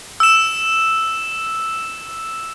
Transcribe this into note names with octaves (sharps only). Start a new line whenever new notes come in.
E6 E7